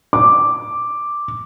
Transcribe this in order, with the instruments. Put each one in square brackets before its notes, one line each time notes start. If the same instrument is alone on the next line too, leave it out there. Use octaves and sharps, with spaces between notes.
[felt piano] D6